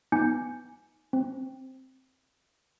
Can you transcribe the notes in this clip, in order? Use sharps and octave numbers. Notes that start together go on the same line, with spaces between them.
B3 D#4 G#5 D6 G6 C#7
C4